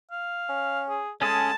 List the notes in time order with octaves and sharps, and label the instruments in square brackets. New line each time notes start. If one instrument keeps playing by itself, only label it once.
[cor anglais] F5
[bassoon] C#4
[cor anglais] G#4
[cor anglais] G#3 [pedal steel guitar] C#4 G#4 [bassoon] A4 [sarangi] A5